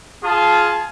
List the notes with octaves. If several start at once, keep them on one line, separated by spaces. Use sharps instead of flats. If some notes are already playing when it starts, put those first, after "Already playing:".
F4 G#4 A5